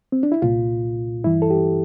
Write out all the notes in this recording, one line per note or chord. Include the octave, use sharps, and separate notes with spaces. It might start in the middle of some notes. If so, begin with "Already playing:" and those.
C4
D4
E4
C2 A#2 F4
G2 E3 E4
A4
G4